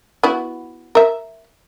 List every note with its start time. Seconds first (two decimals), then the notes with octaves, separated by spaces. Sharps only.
0.23 B3 E4 F#4
0.95 A#4 E5